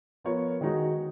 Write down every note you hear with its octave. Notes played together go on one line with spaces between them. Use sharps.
F3 B3 F4 A#4 C#5
D#3 G#3 D#4 F#4